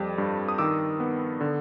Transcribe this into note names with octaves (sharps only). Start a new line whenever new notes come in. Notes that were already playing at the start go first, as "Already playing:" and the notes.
Already playing: F2 G3
G2
D#6
D#3 D6 E6
B3
D3